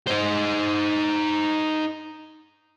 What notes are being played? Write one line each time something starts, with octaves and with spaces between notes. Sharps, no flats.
D#4 C5